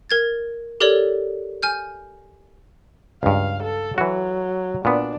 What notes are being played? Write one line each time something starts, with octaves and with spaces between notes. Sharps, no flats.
A#4 G#6 A6
G4 A4 A#4 C#5 D5
G#5 F6 G6
C#2 G2 F5
A4
E3 F#3 F#4
A#2 B3 D4